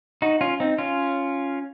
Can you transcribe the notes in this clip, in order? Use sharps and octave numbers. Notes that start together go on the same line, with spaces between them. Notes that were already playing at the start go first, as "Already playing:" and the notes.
D#4 F#4
C#4 F4
C4 D#4
C#4 F4